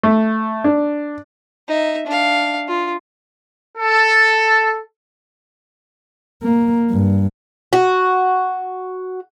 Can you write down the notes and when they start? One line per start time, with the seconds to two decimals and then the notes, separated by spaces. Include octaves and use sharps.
0.03 A3
0.64 D4
1.68 D#4 E5
2.07 D4 F5
2.68 F4
3.77 A4
6.43 A#3
6.90 G2
7.73 F#4